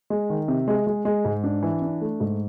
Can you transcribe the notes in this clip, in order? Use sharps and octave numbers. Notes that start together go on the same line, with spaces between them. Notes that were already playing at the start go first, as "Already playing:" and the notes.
G#3
D#3
C3
G#3
G#3
G#3
G#2
D4
E3
D4
A3
G#2